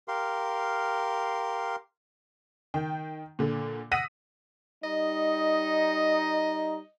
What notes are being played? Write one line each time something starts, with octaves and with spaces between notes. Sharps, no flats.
G4 A#4 F5 C6
D#3 G5
A#2 D3
F#5 D#6 E6 A#6 B6 D#7
G3 D#4 D#5